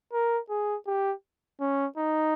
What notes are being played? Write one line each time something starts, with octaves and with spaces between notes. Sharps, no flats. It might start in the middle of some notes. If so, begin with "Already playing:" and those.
A#4
G#4
G4
C#4
D#4